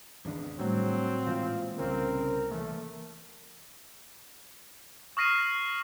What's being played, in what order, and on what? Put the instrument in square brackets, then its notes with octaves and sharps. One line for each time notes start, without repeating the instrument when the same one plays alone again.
[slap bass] G#1 C#3 D4 [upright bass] E2
[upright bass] A2 G3 [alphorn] F#3 [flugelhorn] C4
[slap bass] A#2 E3 G#3 [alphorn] F4
[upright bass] C2 A#2 [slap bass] C#3 [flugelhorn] C4 [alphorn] A#4
[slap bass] E3 A#3 [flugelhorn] A3
[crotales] C#6 D#6 F6 A#6 C7 D#7